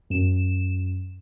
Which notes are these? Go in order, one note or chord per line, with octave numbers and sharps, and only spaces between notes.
F#2 E7